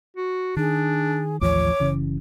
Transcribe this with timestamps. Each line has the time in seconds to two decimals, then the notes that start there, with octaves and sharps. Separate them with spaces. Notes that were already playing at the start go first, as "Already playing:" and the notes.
0.16 F#4
0.57 D#3 D4 G#4
1.41 A1 D#2 F3 C#5 D6
1.80 F#1 C#3 E3